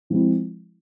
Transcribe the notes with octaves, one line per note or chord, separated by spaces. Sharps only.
F3 G#3 C4 E4